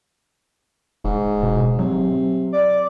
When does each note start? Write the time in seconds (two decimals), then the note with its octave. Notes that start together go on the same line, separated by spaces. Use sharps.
1.05 D#1 G#2
1.43 B2
1.79 C3 F#3
2.53 D5